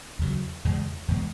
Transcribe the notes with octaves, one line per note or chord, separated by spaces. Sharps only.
E2 C#3 F#3
E2 C#3 G#3
E2 B2 G#3